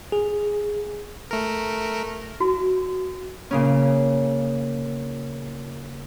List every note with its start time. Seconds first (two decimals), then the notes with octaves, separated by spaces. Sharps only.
0.12 G#4
1.31 A3 A#4
2.40 F#4
3.51 A#2 C#3 C#4